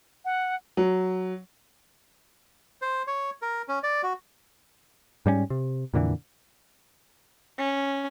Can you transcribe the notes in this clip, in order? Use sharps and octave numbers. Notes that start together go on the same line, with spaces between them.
F#5
F#3
C5
C#5
A#4
C#4
D5
F#4
G#2 G3 A#3 C#4
C3
F2 A#2 D3 E3
C#4